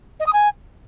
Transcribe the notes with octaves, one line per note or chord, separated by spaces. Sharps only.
D#5
D#6
G#5